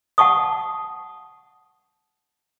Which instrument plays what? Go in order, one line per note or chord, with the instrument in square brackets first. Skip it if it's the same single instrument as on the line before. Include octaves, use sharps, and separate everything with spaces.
[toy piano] F#5 A5 C#6 D#6